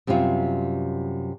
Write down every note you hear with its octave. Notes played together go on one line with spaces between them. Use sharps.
F#2 C3 G3 A3 F4 E5